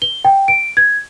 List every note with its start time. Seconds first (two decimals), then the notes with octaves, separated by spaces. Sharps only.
0.02 G7
0.25 G5
0.48 D7
0.77 G#6